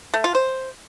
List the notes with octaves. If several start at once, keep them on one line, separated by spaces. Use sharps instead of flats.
A3
F4
C5